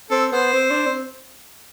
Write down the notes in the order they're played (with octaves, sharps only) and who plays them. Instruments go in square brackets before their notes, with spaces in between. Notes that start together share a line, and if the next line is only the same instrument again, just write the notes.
[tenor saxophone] C4 [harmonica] A4
[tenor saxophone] B3 [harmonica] C5
[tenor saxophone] C4
D4
C4